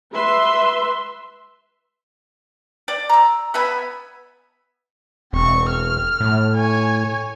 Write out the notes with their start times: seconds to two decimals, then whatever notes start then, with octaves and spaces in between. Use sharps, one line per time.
0.13 B4 E5 C6
2.88 D5
3.09 A#5 E6
3.54 B3 E5 G#5 B5
5.33 E1 C4 C#6
5.70 F6
6.20 A2
6.55 C#5 G#5